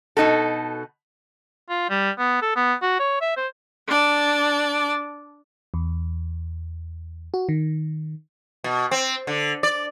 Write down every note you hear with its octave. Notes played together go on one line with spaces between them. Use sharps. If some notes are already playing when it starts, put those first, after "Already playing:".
B2 D#4 F#4 A4
F4
G3
B3
A4
B3
F#4
C#5
E5
C5
D4 D5 A5
E2
F#4
D#3
B2
C4
D3
D5